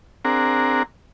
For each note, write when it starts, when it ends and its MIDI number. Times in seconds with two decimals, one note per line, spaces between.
0.25 0.83 60
0.25 0.83 62
0.25 0.83 68
0.25 0.83 70
0.25 0.83 78
0.25 0.83 82